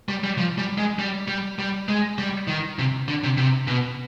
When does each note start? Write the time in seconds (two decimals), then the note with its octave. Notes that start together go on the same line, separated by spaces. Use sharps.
0.09 G3
0.24 G3
0.38 F3
0.58 G3
0.78 G#3
0.99 G3
1.28 G3
1.59 G3
1.89 G#3
2.18 G3
2.48 D#3
2.79 C3
3.08 D3
3.24 C3
3.38 C3
3.67 B2